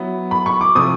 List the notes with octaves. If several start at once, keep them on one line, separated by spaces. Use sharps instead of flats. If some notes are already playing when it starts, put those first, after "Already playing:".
Already playing: F#3 B3 E4
B5
C#6
D6
C3 F3 A3 C4 D#6